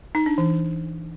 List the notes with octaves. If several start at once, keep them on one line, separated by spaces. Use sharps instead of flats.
D#4
D4
E3